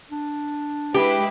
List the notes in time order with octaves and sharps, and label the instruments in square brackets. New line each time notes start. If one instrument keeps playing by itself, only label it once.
[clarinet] D4
[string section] G#3 E4 B4 [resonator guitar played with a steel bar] G4